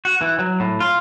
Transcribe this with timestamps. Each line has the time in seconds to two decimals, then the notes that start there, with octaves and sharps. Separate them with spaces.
0.05 F#4
0.21 E3
0.39 F#3
0.60 A2
0.80 F4